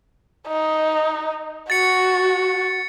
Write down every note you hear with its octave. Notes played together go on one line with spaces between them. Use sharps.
D#4
F#4 A6 C#7